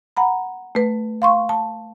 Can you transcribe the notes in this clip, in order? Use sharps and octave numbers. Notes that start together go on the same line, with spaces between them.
F#5 A#5 B5
A3 B4
F5 C6 C#6
A5